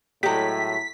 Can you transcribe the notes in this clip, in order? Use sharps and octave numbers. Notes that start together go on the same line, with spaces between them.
A2 F#3 G#3 G4 B6